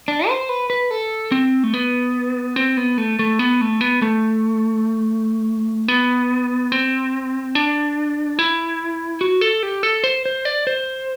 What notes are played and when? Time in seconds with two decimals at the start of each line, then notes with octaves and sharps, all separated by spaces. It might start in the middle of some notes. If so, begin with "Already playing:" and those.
0.08 D4
0.28 C5
0.49 B4
0.70 B4
0.91 A4
1.32 C4
1.64 A3
1.74 B3
2.56 C4
2.77 B3
2.98 A3
3.19 A3
3.39 B3
3.61 A3
3.81 B3
4.02 A3
5.88 B3
6.72 C4
7.55 D4
8.39 E4
9.21 F#4
9.41 A4
9.63 G4
9.83 A4
10.04 C5
10.26 C5
10.45 D5
10.67 C5